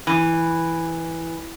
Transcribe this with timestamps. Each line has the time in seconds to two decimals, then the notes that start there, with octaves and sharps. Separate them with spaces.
0.07 E3